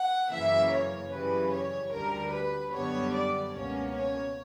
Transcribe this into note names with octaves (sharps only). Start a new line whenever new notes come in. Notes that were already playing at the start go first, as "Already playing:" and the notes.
Already playing: F#5
F#2 C#3 E3 A#3 E5
C#5
F#2 C#3 E3 G3 C#4 B4
C#5
D2 D3 G3 A#4
B4
F#2 D3 G3 B3 C#5
D5
C#2 B2 A#3 C#4 C#5
C#5